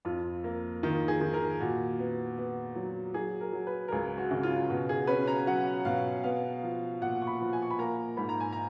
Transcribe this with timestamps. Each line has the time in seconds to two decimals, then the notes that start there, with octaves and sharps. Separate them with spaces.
0.05 F2 F4
0.44 A#3
0.83 D#3 F4
1.08 G#4
1.21 D#3
1.34 A#4
1.60 A#2 F#4
1.99 B3
2.38 B3
2.76 F#3
3.14 F#3 G#4
3.41 A#4
3.53 F#3
3.67 B4
3.88 A#4
3.92 C#2 G#4
4.18 F#4
4.31 C#3
4.43 F4
4.70 B2 F#4
4.89 G#4
5.07 C#4 B4
5.27 A#5
5.47 F#3 F#5
5.85 B2 F5
6.24 B3 F5
6.63 F3
7.01 A#2 F#5
7.22 C#6
7.27 B5
7.40 F3
7.53 G#5
7.62 C#6
7.71 B5
7.79 A#3 A#5
8.17 G#2 B5
8.29 A#5
8.40 G#5
8.53 A#5